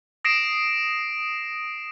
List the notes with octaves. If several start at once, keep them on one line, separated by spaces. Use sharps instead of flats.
D#6 A#6 C7 D7 E7